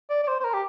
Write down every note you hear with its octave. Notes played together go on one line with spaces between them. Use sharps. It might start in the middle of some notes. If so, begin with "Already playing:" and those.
D5
D5
C5
C5
A#4
G4